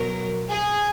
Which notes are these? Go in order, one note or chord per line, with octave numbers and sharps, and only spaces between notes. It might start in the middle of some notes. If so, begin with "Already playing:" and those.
Already playing: B2 F#3 A#4
G#4